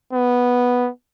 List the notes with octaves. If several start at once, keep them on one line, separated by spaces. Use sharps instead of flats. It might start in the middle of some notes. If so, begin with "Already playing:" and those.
B3